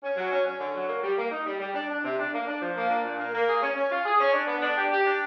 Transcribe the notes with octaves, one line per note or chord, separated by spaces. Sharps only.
C#4
F#3
C#4
C#4
D3
F#3
A#3
G3
A#3
D#4
G3
G3
D4
D4
C3
D4
A#3
D4
F3
A#3
D4
A#2
A#3
A#3
G#4
C#4
C#4
F4
G#4
C#4
D4
B3
D4
G4
G4
D4